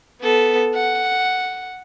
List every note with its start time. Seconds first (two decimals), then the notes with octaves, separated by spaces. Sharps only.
0.21 B3 A4
0.75 F#5